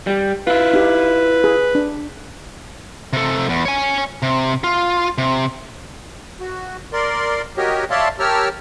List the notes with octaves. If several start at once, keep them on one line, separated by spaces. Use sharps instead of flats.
G3
E4 F4 B4
D#4 G4
G#4
D4
C3 A4
E2
C#5 G#5
C3
F4
C3
F#4
A#4 D5 C6
F#4 G4 A#4 C#5 D#5
C#5 D5 E5 F5 A5 C6
G4 A#4 C#5 A5 E6 F6